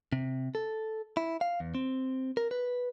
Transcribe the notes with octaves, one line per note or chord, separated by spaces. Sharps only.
C3
A4
E4
F5
E2
C4
A#4
B4